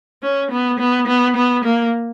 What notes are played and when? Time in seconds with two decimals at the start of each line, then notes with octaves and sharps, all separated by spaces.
0.23 C#4
0.51 B3
0.79 B3
1.07 B3
1.36 B3
1.64 A#3